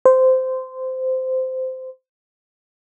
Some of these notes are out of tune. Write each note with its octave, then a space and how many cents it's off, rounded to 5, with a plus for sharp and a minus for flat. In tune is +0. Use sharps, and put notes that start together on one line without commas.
C5 -15